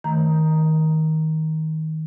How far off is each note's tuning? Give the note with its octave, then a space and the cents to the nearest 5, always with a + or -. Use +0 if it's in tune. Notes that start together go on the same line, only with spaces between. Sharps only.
D#3 +20 A3 -5 A#5 +0